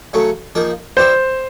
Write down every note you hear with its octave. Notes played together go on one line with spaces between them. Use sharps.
C#3 F#3 A3 C#4
F3 A#3 D#4 G#4
G3 B3 E4 G4 C5